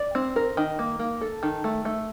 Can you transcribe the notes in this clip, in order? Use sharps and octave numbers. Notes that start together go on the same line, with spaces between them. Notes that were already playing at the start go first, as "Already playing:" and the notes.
Already playing: D5
C4
A#4
D#3
A#3
A#3
A4
D#3
A3
A3